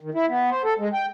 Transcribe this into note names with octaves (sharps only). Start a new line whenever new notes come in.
D#3
E4
B3
C5
A4
G#3
G5